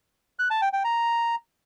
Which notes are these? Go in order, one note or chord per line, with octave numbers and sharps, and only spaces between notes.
F#6
A5
G5
G5
A#5